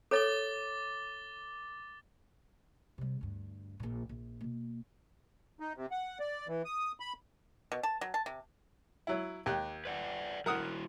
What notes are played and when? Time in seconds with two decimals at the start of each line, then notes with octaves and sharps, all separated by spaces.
0.11 A4 C#5 D6 A6 G7
2.98 C3 G3
3.21 D2 G2
3.80 A#1 A#2
4.09 A#1
4.41 B2 A#3
5.60 D#4
5.76 C3
5.91 F#5
6.20 D5
6.48 E3
6.65 D#6
7.00 B5
7.72 B2
7.83 A5
8.01 F#3
8.14 A5
8.26 C3
9.07 F#3 E4
9.46 D#2 G4 F#6
9.85 B4 D5 F#5
10.46 F#3 E4 A#4 F#5 D#6